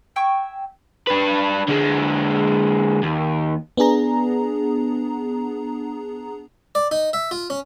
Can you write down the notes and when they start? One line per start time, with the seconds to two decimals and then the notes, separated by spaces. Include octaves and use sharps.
0.16 E5 G5 G#5 C#6
1.07 D4 B4
1.68 D3 G#3
3.03 D#2
3.77 B3 D4 G#4 A#5
6.75 D5
6.91 D#4
7.13 E5
7.31 F4
7.50 C#4